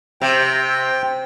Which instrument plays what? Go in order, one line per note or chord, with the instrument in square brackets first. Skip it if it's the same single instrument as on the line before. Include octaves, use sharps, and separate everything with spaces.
[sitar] C3 [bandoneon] G5